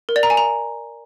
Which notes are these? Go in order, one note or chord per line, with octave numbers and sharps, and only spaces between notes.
A#4
D5
A#5
G#5
A#5